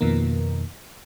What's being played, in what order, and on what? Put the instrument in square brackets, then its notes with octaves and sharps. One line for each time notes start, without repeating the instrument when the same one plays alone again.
[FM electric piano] F2 B2 D#3 A#3